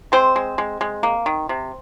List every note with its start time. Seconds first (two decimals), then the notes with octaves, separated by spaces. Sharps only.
0.12 G#3 C4 C5
0.36 G#3
0.58 G#3
0.81 G#3
1.03 A#3
1.26 D#3
1.49 C3